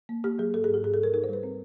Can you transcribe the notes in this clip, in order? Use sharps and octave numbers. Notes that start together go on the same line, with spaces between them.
A#3
A#3 G4
F#3 G#4
G#2 A4
G#4
G#2
G4
G#2 G#4
A4
G3 A#4
D#4 A#4
C5
G3 B4
C4